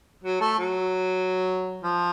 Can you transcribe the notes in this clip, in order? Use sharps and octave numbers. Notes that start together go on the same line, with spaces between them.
F#3
A3
F#3
F3